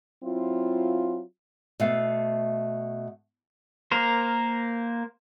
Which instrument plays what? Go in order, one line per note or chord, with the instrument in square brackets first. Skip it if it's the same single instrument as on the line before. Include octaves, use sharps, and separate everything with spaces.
[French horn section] F#3 C4 E4 F4
[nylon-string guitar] B2 A3 F5
[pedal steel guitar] A#3 A#4 C5